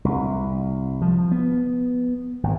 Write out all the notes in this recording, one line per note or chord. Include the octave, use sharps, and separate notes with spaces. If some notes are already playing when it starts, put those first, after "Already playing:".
C2
F3
B3
G#1